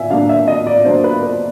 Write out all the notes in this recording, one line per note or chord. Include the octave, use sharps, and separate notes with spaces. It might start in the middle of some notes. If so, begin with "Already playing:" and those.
Already playing: B2 F#3 A#3 E5 G#5
B2 F#3 A#3 D4 F5
E5
D#5
D5
B2 F#3 A#3 D4 C5
B4
B4